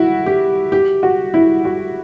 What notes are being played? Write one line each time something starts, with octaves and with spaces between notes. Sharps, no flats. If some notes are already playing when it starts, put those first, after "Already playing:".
Already playing: E4 F#4
G4
G4
F#4
E4
F#4